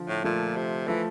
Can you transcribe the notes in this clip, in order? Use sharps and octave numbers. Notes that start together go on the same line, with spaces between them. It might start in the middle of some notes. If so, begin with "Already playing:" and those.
Already playing: D3 F3
A2
A#2 F3 A3
C3
E3 F3 A3